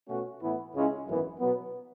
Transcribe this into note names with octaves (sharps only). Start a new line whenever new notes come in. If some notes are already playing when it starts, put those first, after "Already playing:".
B2 A3 C#4 F#4
A2 E3 B3 E4
C#2 C#3 G#3 C#4 E4
G#1 F#2 E3 B3 E4
B2 F#3 B3